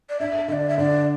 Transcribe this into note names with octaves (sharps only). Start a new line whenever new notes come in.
D5
D4 E5
D3 D5 E5
E5
D3 D5